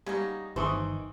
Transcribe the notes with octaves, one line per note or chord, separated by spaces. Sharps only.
C#3 F#3 G3 D#4
G1 B2 D#3 E3 C5 C#6 D#6